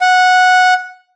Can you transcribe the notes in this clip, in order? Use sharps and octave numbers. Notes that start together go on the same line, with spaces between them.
F#5